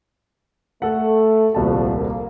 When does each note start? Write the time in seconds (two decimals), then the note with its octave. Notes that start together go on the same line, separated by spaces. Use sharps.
0.82 A3 A4 F#5
1.54 D#1 C2 F3 F#4 A5
1.97 A#3